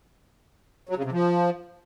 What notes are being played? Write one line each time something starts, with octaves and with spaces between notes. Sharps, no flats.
F#3
C#3
C3
F3